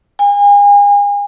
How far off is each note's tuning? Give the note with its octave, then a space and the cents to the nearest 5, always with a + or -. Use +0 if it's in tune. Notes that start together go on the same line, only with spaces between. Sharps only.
G#5 -35